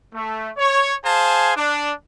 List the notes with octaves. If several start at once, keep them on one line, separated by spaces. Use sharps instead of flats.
A3
C#5
G#4 C5 F5 G#5 A5
D4